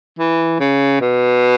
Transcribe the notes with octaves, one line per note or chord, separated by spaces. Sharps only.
E3
C#3
B2